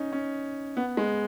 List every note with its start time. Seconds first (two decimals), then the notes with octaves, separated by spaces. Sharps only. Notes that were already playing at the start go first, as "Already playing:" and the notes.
Already playing: C#4 D#4
0.12 C#4
0.77 B3
0.97 G#3